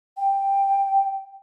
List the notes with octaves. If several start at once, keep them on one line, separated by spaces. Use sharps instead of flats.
G5